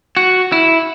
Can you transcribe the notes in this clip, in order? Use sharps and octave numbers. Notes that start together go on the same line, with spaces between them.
F#4
E4